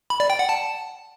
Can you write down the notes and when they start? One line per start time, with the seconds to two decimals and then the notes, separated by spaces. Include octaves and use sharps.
0.10 B5
0.20 D5
0.30 G5
0.39 F#5
0.49 A5